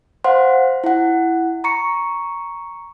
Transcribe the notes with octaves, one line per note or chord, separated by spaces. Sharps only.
C5 F5 F#5 C6
E4 F#5
A#5 C#6 C#7